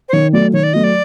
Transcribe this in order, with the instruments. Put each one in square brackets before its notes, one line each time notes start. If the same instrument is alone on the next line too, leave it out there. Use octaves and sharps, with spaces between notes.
[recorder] C5
[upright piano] D#3 [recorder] C#5
[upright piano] F#3 A3 [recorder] D5
[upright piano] D#3 [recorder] C#5
[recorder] D5
[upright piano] F#3 A3 [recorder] D#5
[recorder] D5